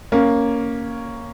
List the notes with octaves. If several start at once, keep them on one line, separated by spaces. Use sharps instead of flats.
A#3 C#4